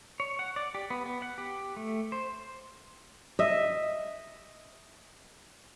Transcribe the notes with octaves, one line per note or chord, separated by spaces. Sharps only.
C#5
F#5
D5
G4
B3
B3
F#5
G4
A3
C5
D#5 E5